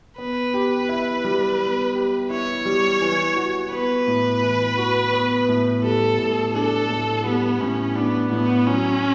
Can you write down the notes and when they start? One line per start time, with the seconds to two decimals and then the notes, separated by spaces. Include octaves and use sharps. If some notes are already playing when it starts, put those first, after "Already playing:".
0.18 B3 B4
0.54 G4
0.89 E4
1.24 G3
1.60 B3
1.95 G4
2.30 E4 C#5
2.65 G3
3.01 E3
3.36 F#4
3.71 B3 B4
4.07 A2
4.43 E3
4.77 F#4
5.13 B3
5.49 A2
5.84 G3 A4
6.19 A2
6.54 D4 A4
6.90 A2
7.25 G3 B3
7.60 A2 C#4
7.96 B3 D4
8.31 A2 B3
8.67 F#3 C#4